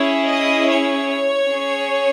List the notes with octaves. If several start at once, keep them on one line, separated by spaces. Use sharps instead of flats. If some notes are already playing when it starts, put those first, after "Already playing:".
Already playing: C#4 E4 G#4 C#5
D#5
C#5
C#4 G#4